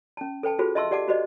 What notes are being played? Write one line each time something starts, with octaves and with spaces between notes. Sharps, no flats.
C#4 A5
A4 B4 G5 A5
F4 F#4 G#4 A4 B4 C5
D#5 E5 A5 C6 C#6 E6
G4 D5 F#5 A5 D6
F#4 G4 B4 C5 D5 D#5